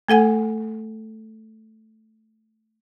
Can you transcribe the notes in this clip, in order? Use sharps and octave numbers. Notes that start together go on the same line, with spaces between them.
A3 A4 F#5 G#5